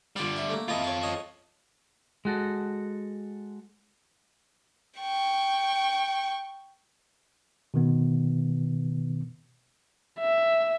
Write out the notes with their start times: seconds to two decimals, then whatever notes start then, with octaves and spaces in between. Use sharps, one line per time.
0.16 D3 G3 F4 D5 G5
0.36 E5
0.49 A3 A#3
0.68 E4 F4 A4 A#4 D#5
0.84 C#5 F5
1.02 C#5 D#5 C#6
2.25 G#3 F#4 A4
5.00 G5 C#6
7.74 B2 D#3 B3
10.20 E5